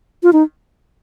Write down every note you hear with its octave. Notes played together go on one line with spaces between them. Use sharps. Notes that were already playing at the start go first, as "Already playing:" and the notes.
F4
D#4